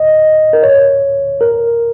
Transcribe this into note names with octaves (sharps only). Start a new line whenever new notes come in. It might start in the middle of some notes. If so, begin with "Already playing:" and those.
Already playing: D#5
A#4
C#5
A#4